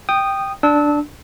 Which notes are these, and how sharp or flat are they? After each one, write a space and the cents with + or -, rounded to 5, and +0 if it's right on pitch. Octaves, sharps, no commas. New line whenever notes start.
G5 +0 D#6 -15
D4 +0 E6 -30